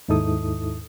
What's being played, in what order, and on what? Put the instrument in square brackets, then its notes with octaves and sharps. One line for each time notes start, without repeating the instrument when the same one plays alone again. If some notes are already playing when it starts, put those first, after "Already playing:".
[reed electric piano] D#2 G#2 D#4 E4 A4 D#6